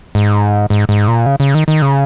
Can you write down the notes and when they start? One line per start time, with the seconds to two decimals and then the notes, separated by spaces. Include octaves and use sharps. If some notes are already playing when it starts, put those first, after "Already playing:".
0.15 G#2
0.70 G#2
0.89 G#2
1.08 A#2
1.26 C#3
1.40 C#3
1.55 D#3
1.68 D#3
1.82 C#3